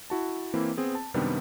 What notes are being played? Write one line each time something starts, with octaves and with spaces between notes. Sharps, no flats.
E4 F#4 A5
E3 A#3 C4 E4
B3 C4 G#4
A5
F#2 C3 D#3 G3 B3 D4